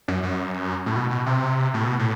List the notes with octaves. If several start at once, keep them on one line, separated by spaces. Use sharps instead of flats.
F#2
F#2
A2
B2
B2
C3
A2
B2
A2